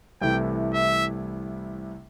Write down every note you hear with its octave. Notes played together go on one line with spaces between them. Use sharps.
C2 C3 E3 A3 E4 G5
E5